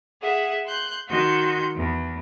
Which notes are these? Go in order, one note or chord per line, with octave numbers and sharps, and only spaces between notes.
G#4 E5 F#5
C6 F#6 G6
D#3 F#4 C6 G6
E2